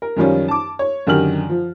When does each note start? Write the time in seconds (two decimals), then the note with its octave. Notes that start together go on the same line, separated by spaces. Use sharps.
0.02 A#4
0.16 F#2 D#3 F3 G3 C#4 F4
0.48 A5 D6
0.79 C#5
1.07 F#2 D3 D#3 G4 F6 F#7
1.49 F3